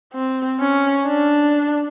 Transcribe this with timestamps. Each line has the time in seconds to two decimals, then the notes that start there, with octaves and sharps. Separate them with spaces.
0.14 C4
0.59 C#4
1.06 D4